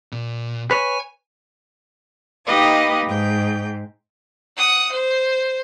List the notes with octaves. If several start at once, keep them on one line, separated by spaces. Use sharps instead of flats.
A#2
B4 C#5 G#5
A#3 D#4 G4 B4 D#5 F5
G#2 G5
F#5 D#6
C5